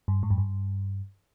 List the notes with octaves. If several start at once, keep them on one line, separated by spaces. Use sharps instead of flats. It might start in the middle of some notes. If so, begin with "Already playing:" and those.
G2
G#2
F#2
G2